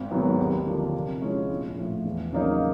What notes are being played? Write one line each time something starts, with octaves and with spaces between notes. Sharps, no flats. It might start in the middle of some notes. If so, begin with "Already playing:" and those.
Already playing: G#1
G#2 D#3 F#3 B3
D#2
D3 F3 A#3 D4
C3
F3 G#3 C#4 E4
A#1
A2 F3
E2
C#3 F#3 A#3 D#4